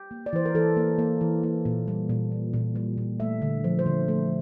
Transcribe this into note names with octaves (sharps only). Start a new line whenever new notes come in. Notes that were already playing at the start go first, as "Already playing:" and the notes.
Already playing: G4
A#3
D5
E3 C5
A#4
E3 A4
A#3
A#3
E3
A#3
A#2
G3
A#2
A#3
A#2
G3
A#2
A3 E5
D3
F3
C5
D3
A3